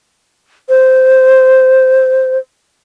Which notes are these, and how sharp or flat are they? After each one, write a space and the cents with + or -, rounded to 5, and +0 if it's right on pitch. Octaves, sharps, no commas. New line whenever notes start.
C5 -5